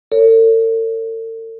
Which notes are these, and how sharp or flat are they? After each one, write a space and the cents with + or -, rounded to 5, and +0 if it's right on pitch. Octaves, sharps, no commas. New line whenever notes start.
A4 +45 C#5 +10